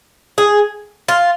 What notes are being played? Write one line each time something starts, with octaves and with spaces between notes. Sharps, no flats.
G#4
F4